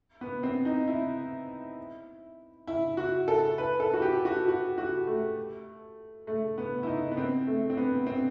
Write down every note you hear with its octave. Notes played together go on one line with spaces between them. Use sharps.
B3
C4
D#4
E4
E4
F#4
A4
B4
A4
F#4
G4
F#4
F#4
F#4
A3
A3
B3
E4
D#4
B3
C4
A3
C4
B3
C4